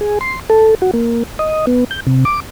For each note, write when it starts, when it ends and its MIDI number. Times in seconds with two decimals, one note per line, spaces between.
0.01 0.19 68
0.21 0.39 84
0.50 0.75 69
0.82 0.91 66
0.94 1.23 58
1.39 1.66 75
1.67 1.84 59
1.91 2.00 91
2.07 2.25 48
2.25 2.40 86